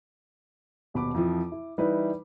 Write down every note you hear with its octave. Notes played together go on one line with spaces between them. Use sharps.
D#1 B2 B5 D6
F2 E3 F3
E4
E3 G3 D#4 E4 B4